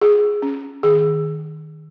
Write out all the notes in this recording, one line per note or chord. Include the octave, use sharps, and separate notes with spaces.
F4 G#4
C#4
D#3 G#4